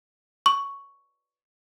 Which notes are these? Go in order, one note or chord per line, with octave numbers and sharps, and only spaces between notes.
C#6